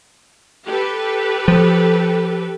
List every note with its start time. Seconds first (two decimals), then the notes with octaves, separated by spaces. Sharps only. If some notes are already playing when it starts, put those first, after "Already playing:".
0.66 G4 A4 B4
1.48 F3